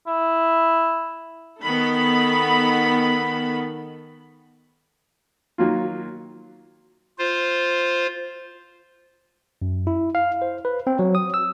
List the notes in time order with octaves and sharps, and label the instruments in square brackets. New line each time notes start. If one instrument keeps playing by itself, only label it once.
[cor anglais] E4
[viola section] D#3 B3 A4 B5
[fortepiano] D#3 F#3 A#3 F4
[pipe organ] F4 C5
[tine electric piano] F#2
E4
F5
C5
B4
C4
F#3
D#6
E6